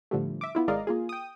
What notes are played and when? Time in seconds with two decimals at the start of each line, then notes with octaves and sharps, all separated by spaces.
0.11 A2 D3 F3 G3 A3
0.41 E5 D6
0.55 B3 E4 F4
0.68 G#1 G#3 A#4 D5 D#5 F5
0.87 A#3 F4 G#4
1.09 G5 D#6